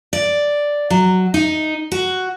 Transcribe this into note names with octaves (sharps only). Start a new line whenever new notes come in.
D5
F#3
D#4
F#4